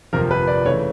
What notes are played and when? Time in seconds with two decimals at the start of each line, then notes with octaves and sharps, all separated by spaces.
0.13 G1 F2 C3 F3 A#4
0.31 B4
0.47 D5
0.65 C#3 E3 A3 C#5